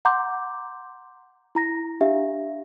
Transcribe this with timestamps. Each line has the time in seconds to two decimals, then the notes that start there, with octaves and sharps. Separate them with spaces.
0.05 F#5 A#5 C6 D6 G6
1.55 E4 A#5 A#6
2.01 D4 G4 E5 F5